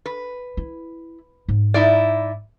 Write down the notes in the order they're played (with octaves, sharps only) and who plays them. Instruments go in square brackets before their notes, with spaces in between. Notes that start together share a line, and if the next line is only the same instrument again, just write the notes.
[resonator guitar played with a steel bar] B4
[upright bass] E4
G#2
[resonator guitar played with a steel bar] D#4 E4 D5